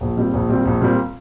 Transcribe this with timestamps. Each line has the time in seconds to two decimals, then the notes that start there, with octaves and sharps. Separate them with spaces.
0.01 A#1
0.17 A#2 G3 C4
0.33 A#1
0.49 A#2 G3 C4
0.65 A#1
0.81 A#2 G3 C4